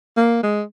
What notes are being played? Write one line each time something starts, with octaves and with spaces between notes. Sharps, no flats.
A#3
G#3